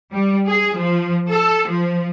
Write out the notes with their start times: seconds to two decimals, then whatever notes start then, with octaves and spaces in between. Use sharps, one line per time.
0.11 G3
0.47 G#4
0.76 F3
1.29 A4
1.67 F3